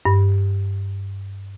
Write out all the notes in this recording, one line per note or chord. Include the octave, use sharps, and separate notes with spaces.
G2